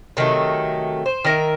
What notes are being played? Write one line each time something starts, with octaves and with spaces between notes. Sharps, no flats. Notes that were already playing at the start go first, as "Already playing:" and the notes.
C3 D#3 F#3 A3
C5
D#3 A#4 E5